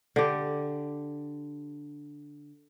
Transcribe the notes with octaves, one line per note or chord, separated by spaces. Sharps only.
D3 G4